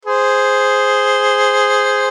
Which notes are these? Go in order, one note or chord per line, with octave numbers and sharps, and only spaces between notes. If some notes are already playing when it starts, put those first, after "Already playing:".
G#4 C5